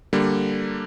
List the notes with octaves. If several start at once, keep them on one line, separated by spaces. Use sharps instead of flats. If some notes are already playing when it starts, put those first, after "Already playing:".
D3 G3 A#3